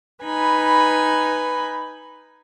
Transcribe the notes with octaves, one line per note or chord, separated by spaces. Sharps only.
D#4 B4 G#5 B5